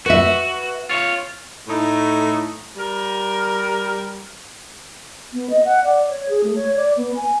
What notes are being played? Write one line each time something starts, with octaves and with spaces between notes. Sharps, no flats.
F#4 B4 E5
F4 C#5
A2 A3 D#4
G3 A#4
B3
D#5
F#5
D5
C#5
G#4
A3
C#5
D5
B3
G#5